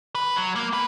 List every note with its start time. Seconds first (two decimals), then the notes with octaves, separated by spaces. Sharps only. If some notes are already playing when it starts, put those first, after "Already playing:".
0.15 B4
0.36 F#3
0.56 A#3
0.73 B4